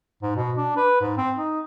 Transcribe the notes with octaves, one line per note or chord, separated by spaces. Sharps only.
G#2
B2
D4
B4
G#2
C4
D#4